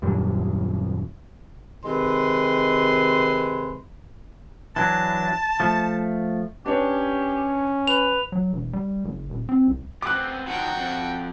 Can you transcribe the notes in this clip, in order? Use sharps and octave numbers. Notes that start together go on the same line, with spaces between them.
D#1 F#2 G3
C3 D#3 G#3 B4 C6
E3 F#3 D4 A5
F3 A3
C#4 D4 G4 B4 C#5
B4 F7
F#3
E1
G3
F#1
D#1
C4
C2
B3 C4 D6 F#6
D#3 F3 F#4 G5
F2